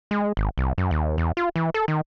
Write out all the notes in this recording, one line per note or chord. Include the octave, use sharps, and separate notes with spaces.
G#3
G#1
C2
F#2
D#2
E2
F4
E3
A4
D#3